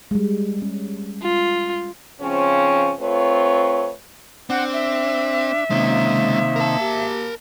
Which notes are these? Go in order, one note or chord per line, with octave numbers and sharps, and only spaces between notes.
G3 G#3
C#4
F4
G#2 C#3 F3 C4 C#4
A3 C4 F4 B4 C#5
C4 D4 F#5
E5
C3 D#3 G#3 A#3 C#4
A#4 A5
A#3 G4